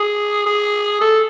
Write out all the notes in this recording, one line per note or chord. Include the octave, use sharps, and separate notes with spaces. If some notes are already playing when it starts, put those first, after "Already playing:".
Already playing: G#4
G#4
A4